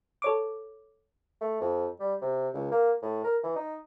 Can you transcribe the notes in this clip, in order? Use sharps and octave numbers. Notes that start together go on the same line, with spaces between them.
A4 C#5 D6
A3
F2
G3
C3
C#2
A#3
A2
A#4
E3
D#4